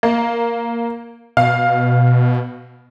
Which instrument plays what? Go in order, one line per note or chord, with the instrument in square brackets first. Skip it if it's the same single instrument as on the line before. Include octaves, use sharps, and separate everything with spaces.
[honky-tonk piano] A#3
[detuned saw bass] B2 [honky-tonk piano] F5